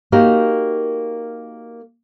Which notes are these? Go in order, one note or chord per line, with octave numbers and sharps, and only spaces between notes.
A#3 D#4 F#4 G4 A#4